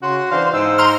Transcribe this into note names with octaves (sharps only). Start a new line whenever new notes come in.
C#3 F#4 C6
E3 D4 C5 F5
G#2 D#4 C5 E6
A#5 C6 F6